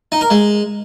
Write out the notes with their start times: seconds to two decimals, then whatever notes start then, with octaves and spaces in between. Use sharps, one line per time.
0.12 D#4
0.21 A#4
0.30 G#3